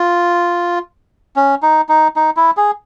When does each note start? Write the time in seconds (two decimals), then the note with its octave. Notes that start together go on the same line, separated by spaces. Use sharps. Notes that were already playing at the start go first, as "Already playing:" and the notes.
Already playing: F4
1.36 C#4
1.62 D#4
1.89 D#4
2.16 D#4
2.37 E4
2.57 G#4